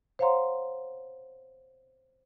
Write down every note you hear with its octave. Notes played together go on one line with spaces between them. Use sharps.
C5 C#5 F5 F#5 A#5 C6